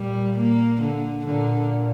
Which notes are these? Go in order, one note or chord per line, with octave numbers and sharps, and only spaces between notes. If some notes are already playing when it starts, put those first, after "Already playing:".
Already playing: A#2 G3
A#3
D3
A#2 D3